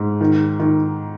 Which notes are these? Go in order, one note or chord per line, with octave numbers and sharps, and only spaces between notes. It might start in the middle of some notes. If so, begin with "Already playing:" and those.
Already playing: G#2
D#3
D#3